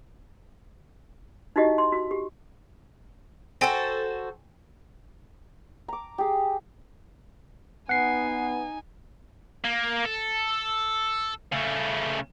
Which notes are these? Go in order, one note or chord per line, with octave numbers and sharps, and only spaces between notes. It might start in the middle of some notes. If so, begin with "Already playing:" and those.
D#4 E4 F#4 G4 D#5
C6
F#4
G4
F#4 A4 C5 G5 G#5 A#6
A#5 D6
G4 G#4
B3 D#4 F#5 G#5 C7
A#3
A4
C#3 A3